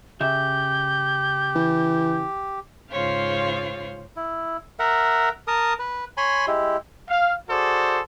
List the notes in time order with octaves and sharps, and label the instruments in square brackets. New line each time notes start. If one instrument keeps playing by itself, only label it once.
[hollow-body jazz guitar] C#3 E5 [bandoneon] G4 [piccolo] G6
[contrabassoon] E3
[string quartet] G#2 C#3 F4 C5 C#5 F5
[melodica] E4
A#4 E5 F#5
A#4 A5 D#6
B4
C#5 G#5 B5 C6
G#3 E4 G4
[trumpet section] F5
F#4 G#4 A4 C5 D5